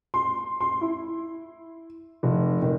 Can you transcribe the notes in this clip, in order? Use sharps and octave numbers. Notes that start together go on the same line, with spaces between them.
C6
C6
E4
F1
D#3